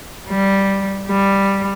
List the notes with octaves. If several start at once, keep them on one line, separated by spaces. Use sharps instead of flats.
G3
G3